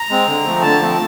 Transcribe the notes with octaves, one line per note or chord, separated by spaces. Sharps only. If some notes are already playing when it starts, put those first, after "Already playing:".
Already playing: A#5
G#3 C4
D3
F3 A3 C4
D3 A5
F3 A3 C4